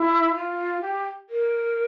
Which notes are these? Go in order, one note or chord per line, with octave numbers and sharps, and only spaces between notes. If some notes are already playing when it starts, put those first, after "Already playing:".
Already playing: E4
F4
G4
A#4